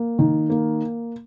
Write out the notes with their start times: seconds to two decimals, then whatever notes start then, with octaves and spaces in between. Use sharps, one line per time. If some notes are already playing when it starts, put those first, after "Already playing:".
Already playing: A#3
0.19 D#3
0.50 A#3